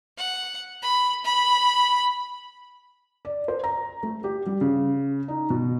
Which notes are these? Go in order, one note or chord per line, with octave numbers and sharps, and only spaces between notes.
F#5
B5
B5
D5
C5
A#5
A3
G4
G3
C#3
D#4
B2